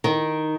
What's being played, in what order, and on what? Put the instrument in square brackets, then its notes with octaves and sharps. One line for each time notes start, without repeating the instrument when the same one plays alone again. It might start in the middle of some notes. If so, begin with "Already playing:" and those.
[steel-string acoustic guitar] D#3